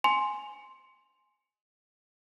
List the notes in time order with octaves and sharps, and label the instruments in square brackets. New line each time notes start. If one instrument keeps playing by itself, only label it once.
[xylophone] G#5 C6